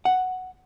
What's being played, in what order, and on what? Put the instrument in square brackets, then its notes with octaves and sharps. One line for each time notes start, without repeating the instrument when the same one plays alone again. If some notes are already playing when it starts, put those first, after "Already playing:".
[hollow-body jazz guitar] F#5